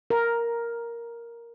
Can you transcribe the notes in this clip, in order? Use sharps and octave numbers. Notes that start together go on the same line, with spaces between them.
A#4